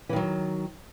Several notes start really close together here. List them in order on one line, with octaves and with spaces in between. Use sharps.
E3 D#3 F#3